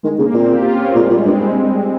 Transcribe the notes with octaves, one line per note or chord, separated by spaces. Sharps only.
D#3 G#3
C#3 A#3
A#2 C4
G4
F4
C#4
C4
A#2 G#3
G3
A#2
G#3
G2
C4